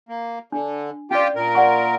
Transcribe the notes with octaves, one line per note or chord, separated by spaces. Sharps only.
A#3
D3 D4
C#4 F4 G4 D5 G5
A#2 A#4
D5 F#5 C#6